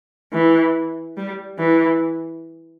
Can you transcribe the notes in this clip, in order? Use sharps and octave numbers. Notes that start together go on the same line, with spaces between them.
E3
G3
E3